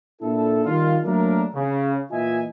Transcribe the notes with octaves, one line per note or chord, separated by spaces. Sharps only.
A#2 D4 E4 A4
D#3 G3 D#4 F4
F#3 A3 A#3 D4 A4 A#4
C#3
A#2 E3 F4 D#5 E5 G#5